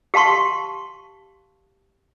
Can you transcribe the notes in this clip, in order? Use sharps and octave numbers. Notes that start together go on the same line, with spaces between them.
G4 F5 A5 C6 C#6